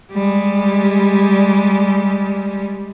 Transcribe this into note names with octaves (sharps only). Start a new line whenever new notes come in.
G3 G#3